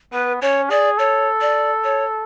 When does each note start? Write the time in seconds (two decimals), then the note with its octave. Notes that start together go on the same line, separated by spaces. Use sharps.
0.13 B3 B4
0.42 C#4 C#5
0.70 G#4 D5
0.98 A4 C#5
1.41 D5
1.84 C#5